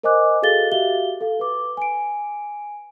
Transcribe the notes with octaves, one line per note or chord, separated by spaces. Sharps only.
A#4 C5 D#5 G#5 D6 F#6
F#4 G#4 A4 F5 A6 G7
F#4 G4 E5 F5 G7
A4 F5
B4 D6
G#5 D7